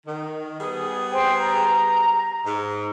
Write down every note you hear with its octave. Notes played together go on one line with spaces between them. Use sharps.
D#3
G3 B3 G#4
C5 G5
A#5
G#2